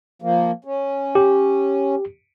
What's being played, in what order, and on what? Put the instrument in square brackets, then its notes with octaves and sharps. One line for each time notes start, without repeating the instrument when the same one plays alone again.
[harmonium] F3 A#3
C#4
[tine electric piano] G4